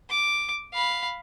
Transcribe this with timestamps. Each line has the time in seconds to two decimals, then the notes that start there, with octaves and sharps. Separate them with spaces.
0.10 D6
0.73 F5 B5